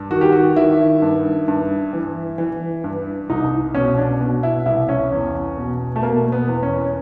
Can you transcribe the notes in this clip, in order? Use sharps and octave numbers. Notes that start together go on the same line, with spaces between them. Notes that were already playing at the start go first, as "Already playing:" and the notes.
Already playing: G2
D#3 F#4
G4
F#4
D#3 E4
G2
G2
E3
E3
G2
C2 D#4
B2 C#4
D4
B2
E4
C2 E4
C#4
E2
B2
A3
B2 A#3
B3
E2
C#4